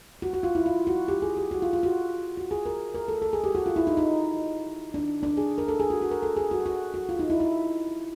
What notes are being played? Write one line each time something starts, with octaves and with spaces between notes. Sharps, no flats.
F#4
F#4
F4
E4
F4
F#4
G4
G#4
G4
F#4
F4
F4
F#4
F#4
G#4
A#4
A#4
A4
A4
G#4
G4
F#4
F4
E4
D#4
D#4
D4
D4
G#4
A#4
A4
G#4
F#4
F#4
A#4
A4
G#4
F#4
F#4
F#4
F4
D#4
E4
E4